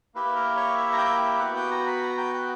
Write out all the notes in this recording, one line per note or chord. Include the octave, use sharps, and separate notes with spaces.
A#3 E4 G4 B4
A#4
C#5
E5
A#5
G5
B3 F#4 F#5
G5
A#5
B5
A#5
G5
F#5